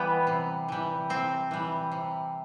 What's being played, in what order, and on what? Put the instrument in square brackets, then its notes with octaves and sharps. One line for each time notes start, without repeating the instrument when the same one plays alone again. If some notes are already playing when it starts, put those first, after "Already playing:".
Already playing: [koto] E3 G3 B3
C3
E3 G3
C3 C4
E3 G3
C3